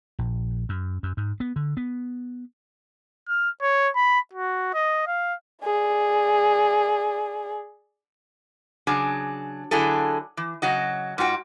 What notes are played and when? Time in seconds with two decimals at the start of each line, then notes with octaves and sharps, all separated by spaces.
0.19 A#1
0.69 F#2
1.03 F#2
1.17 G#2
1.40 B3
1.56 D3
1.77 B3
3.28 F6
3.61 C#5
3.95 B5
4.33 F#4
4.74 D#5
5.07 F5
5.64 G#4 D5
8.87 C#3 F#3 D4 G#4
9.71 D3 F#3 E4 G#4 A4
10.37 E3
10.62 C#3 F#3 F#4 D#5
11.18 G#2 F4 F#4 G5